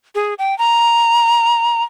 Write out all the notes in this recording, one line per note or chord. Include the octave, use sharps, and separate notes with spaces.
G#4
G5
A#5